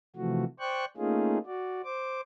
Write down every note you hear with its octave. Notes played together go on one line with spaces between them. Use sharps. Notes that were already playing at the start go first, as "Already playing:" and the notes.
C3 E3 F3 A3 F#4
C5 D5 G5 C#6 F#6
A3 A#3 C#4 D#4 F4 G#4
F#4 D5
C5 D6